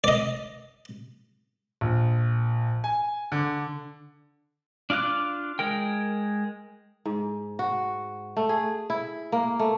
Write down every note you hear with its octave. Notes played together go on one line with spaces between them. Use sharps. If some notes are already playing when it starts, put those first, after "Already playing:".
D5 D#5
A#1
G#5
D3
D4 F4 F5 D6 F#6
G#3 A#4 G5
G#2
F#4
A3
G#4
E4
A#3
A3